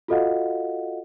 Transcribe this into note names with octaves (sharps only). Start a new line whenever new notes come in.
F4 F#4 A4 D#5 F5 F#5